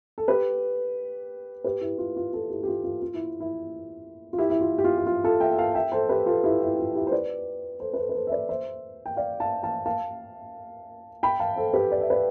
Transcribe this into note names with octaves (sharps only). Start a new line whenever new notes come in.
A4
G4 B4
G4 B4
E4 G4
F4
F4
F4 A4
E4 G4
G4
F4
F4
F4
E4
E4
F4
E4 G4
E4
F4
G4
F4
G4
F4
F4 A4
E5 G5
F5 A5
E5 G5
A4 C5
G4 B4
F4 A4
E4 G4
E4
F4
E4 G4
C5
B4 D5
A4 C5
B4
A4 C5
B4
A4 C5
E5
B4 D5
C5 E5
G5
D5 F5
F5 A5
F5 A5
F5 A5
G5 B5
F5 A5
A4 C5
G4 B4
D5
E5
B4 D5